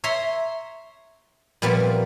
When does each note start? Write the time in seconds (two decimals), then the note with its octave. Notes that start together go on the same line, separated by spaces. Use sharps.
0.04 C#5 E5 A#5 C6
1.62 A#2 F3 G3 B3 C4